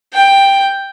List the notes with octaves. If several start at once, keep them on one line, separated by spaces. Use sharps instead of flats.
G5